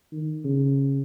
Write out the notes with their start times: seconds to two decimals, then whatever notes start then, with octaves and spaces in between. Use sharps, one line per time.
0.12 D#3
0.45 C#3